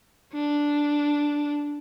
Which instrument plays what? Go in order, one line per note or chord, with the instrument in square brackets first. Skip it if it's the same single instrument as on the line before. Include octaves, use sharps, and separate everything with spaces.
[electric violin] D4